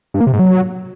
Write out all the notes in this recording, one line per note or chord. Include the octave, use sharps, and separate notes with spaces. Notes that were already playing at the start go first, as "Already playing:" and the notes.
G2
A#3
C3
G#2
F#3